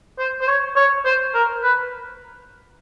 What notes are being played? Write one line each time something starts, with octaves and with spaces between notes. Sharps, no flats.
C5
C5
C#5
C#5
C5
A#4
B4